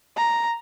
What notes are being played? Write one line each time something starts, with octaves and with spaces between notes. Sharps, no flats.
A#5